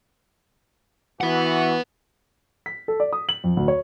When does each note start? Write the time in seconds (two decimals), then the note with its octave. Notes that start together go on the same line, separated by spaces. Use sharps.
1.21 E3 F#4 B4 F#5
2.66 B6
2.88 A4
3.00 D5
3.13 D#6
3.29 F#7
3.44 F2
3.57 D2
3.68 C#5